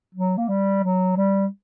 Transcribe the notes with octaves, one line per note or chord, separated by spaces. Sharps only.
F#3
A#3
G3
F#3
G3